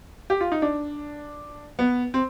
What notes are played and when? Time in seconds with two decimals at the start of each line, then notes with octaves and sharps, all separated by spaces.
0.30 G4
0.41 F4
0.52 D#4
0.62 D4
1.79 B3
2.14 C4